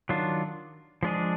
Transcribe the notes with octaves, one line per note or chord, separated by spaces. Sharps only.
D#3 F#3 D4 F4
F3 G#3 D4 G#4